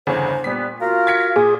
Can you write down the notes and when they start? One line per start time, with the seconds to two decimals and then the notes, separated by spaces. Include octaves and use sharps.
0.07 G1 E2 C#3 C5
0.44 A#2 G3 B3 B6
0.81 F4 F#4 A#4 F5
1.07 G#6 B6 C#7
1.36 A#2 G#4